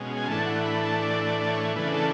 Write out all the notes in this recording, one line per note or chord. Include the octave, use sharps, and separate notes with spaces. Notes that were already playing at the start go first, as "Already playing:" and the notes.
Already playing: B2 G#3 C#4
G#5
A2 E3 A3 D4 A5
F#5
B5
A5
D5
D5
D5
C#5
C#3 E3 A3 D4 B4
A4